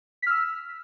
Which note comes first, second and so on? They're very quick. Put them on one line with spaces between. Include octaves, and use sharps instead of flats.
B6 F6 E6